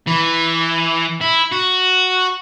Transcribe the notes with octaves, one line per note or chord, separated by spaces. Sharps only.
E3
E4
F#4